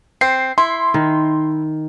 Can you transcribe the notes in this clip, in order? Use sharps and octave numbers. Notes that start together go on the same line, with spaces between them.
C4 C7
E4 C6
D#3